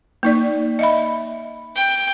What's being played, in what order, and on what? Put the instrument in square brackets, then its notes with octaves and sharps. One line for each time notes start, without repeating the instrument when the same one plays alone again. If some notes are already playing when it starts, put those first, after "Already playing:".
[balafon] A#3 D#4 D5
D#5 E5 B5
[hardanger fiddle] G5